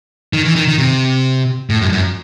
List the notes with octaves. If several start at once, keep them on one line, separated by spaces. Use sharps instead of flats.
D#3
E3
D#3
D#3
C3
A2
F#2
G2
F#2